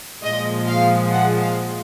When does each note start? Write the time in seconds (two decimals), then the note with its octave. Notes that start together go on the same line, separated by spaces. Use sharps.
0.24 A#2 F3 G#3 D#5
0.68 F5
1.12 F#5
1.40 F5